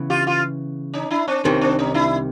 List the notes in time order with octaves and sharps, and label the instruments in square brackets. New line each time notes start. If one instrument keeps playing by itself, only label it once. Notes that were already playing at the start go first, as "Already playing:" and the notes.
Already playing: [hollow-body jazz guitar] C#3 E3 B3
[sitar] F4 G4
F4 G4
C#4 D#4
D4 E4
C4 D4
[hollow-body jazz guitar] C2 C3 D#3 [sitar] B3 C#4
[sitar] C4 D4
C#4 D#4
D4 E4